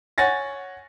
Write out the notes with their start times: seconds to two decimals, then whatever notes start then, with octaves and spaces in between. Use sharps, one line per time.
0.18 C#5 F#5 G#5 A6 A#6